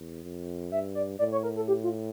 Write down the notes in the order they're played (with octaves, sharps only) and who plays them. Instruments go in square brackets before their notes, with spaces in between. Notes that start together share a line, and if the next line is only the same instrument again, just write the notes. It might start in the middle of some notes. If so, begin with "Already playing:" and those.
Already playing: [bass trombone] E2
F2
[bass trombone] G2 [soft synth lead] E5
[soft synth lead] D5
[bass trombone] A2 [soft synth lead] D5
[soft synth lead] C#5
A#4
A4
G4
F4